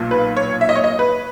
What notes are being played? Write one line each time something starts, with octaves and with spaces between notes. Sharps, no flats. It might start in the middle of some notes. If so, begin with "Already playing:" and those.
Already playing: B1 A#2
B4
C#5
E5
D#5
C#5
D#5
B4